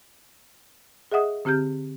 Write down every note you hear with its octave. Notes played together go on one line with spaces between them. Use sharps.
G#4 D#5 E5 F#5 D#6
D3 C4 G4 F6 G6